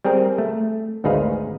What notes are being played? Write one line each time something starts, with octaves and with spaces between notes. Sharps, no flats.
G3 C4 G#4 A#4 G5
A3
G#1 D2 D#4 G#4 B4 F5